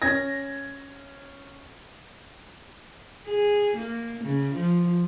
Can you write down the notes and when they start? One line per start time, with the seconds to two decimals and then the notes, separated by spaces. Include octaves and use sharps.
0.02 C#4 G#6 A#6
3.27 G#4
3.77 A#3
4.24 C#3
4.54 F3